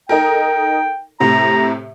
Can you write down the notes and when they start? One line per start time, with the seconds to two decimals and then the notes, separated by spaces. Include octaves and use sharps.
0.09 D#4 A4 A#4 G5
1.20 A2 C3 A#5